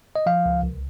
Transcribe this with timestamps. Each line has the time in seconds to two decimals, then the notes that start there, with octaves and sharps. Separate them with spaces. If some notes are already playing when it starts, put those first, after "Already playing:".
0.16 D#5
0.26 F3 F5
0.46 C#2
0.63 C2